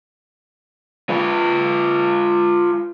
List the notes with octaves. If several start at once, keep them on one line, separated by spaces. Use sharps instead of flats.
F4 B4